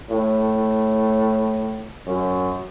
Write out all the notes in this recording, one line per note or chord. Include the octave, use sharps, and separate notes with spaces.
A2
F#2